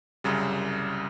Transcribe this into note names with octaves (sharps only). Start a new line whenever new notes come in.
C2 F#2 C#3 G3